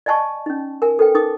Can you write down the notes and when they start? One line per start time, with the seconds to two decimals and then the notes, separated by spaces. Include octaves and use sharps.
0.06 D5 D#5 G#5 A5 C#6
0.46 C#4 D#4
0.82 A#4 G#5
0.99 A4 B4 G5
1.15 D#4 A#4 D6 D#6